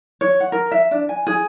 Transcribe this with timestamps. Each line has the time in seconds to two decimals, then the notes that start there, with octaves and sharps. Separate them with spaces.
0.21 C#5
0.40 F#5
0.52 A#4
0.71 E5
0.91 D4
1.09 G#5
1.27 G#4